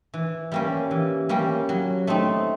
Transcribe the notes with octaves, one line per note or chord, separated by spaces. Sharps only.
E3
G3 A#3 C#4
E3
G3 A#3 C#4
F#3
A3 C4 D#4